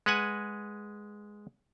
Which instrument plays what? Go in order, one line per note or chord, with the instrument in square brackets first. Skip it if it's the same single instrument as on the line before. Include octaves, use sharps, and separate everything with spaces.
[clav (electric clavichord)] G#3 B4 F#5 G#5